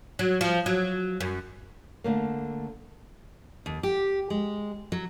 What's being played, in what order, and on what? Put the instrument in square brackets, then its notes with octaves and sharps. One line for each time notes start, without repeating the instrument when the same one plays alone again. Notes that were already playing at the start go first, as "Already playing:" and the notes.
[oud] F#3
F3
F#3
F#2
[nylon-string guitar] D3 A3 A#3
[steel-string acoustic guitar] D#2
G4
G#3
F#3